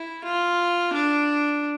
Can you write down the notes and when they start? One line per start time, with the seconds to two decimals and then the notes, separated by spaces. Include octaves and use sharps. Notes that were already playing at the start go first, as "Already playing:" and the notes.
Already playing: E4
0.24 F4
0.93 D4